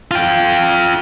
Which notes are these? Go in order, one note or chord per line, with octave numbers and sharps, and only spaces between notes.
F4 G5